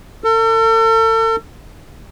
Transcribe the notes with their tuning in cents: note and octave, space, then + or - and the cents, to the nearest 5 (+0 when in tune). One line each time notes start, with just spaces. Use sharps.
A4 +40